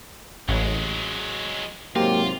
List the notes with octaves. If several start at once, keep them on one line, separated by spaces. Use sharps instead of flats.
A1 F#3 G#3
G#2 C3 F#3 A#3 F4 G4